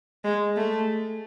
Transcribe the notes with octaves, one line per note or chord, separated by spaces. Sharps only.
G#3
A3